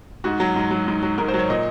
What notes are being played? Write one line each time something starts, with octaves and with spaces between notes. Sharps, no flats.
G#2 F#4
F#3
G#2
F#3
G#2
F#3
G#2 A#4
C5
F#3
C#5
A#2 D#5